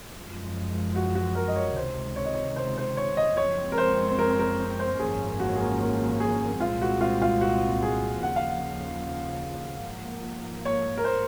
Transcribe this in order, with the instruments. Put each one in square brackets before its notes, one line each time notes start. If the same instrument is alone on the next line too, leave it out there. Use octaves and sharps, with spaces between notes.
[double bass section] F#2 F3 G#3
[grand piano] F#4
F#4
A#4
D#5
C#5
[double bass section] C#2 C3 D#3 [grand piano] C5
[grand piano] C#5
D#5
C#5
C5
C5
C#5
D#5
[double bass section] F#1 F#2 F3 G#3 C4 [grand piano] C#5
[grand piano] A#4
C5
A#4
A#4
C5
[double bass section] G#1 F#2 F3 A#3 C#4 [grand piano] G#4
[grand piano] F#4
G#4
A#4
A#4
G#4
[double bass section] C2 A#2 G#3 C4 [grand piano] F4
[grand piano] F#4
F4
F4
F#4
G#4
[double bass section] D#2 C#3 F3 [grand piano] F#5
[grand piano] F5
F#5
[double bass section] G#2 F3 A#3
[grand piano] C#5
A#4
C5